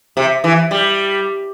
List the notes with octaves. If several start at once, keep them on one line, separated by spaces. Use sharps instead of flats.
C3
E3
G3